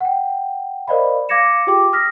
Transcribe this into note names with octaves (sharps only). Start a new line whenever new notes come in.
F#5 G5
A#4 C5 D5 D#5 F5 B5
F5 D6 G#6 A#6 C#7 E7
F4 G4 G#4 G5 D6
D#6 F6 A#6 B6